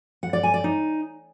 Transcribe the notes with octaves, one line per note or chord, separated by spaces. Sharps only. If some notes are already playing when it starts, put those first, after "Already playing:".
F#5
D5
G#5
D5
D#4